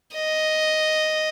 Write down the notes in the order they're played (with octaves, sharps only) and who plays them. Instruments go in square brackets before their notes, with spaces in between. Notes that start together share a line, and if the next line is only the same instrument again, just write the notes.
[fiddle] D#5